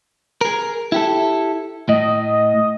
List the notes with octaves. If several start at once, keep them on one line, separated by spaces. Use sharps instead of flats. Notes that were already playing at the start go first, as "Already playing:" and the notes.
G#4 A#4
E4 G4 A4
A2 D#5